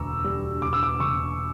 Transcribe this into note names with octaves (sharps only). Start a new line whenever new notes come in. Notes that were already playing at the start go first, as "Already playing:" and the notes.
Already playing: E1 D2 A#5 C#6 D6 E6
G3
E1 D6
E6
D6
E1 C#6